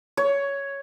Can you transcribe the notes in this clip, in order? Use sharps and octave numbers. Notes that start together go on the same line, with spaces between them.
C#5